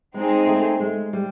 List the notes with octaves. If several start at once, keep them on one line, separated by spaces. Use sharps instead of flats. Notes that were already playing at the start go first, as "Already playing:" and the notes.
G#3 C4 D#4 G#4
A3
G#3
G3